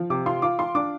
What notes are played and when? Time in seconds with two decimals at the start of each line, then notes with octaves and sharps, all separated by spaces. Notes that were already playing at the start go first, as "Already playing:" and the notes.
Already playing: F3
0.10 C3 D6
0.26 F4 C6
0.42 F4 D6
0.59 F4 C6
0.75 D4 D6